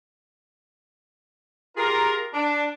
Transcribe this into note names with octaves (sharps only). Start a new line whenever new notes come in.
F4 G4 G#4 A#4
D4